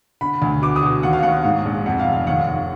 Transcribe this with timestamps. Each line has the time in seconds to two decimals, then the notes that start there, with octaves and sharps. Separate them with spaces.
0.21 D3 B5
0.42 D2
0.62 B2 D6
0.76 D#6
0.82 B2
1.03 D#2 F#5
1.13 F5
1.23 D#2 F#5
1.44 G#2
1.65 A#1
1.86 F2 F#5
2.00 F5
2.06 F1
2.12 F5
2.27 D#2 F#5
2.47 D#2